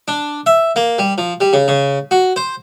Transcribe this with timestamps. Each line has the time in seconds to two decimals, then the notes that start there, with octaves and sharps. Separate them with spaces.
0.08 D4
0.46 E5
0.76 A#3
0.99 G3
1.18 F3
1.41 G3
1.53 C#3
1.68 C#3
2.11 F#4
2.36 C5